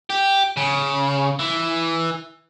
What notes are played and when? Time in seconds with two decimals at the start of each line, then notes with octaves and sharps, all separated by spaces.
0.10 G4
0.57 C#3
1.39 E3